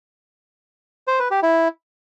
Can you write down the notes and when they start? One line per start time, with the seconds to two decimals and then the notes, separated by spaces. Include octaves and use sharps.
1.08 C5
1.19 B4
1.31 G4
1.43 E4